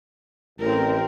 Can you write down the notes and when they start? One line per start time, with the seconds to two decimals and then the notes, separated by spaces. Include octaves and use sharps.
0.59 A1 C4 A#4